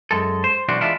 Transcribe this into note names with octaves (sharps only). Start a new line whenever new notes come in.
F#2 G#3 A4
C5
B1 E3 D4 F#4 C5
E3 G#3 B3 D4 E4 F4